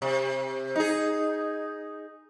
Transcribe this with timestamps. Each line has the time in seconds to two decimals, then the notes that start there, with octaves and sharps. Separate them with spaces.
0.02 C3
0.76 D#4 G#4